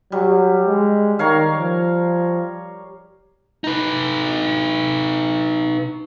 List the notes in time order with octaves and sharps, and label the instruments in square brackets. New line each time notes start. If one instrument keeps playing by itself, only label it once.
[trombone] F#3 [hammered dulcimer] G3
[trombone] G#3
[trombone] D#3 [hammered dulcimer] A#4 C#5 F5
[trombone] F3
[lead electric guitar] D#4 B4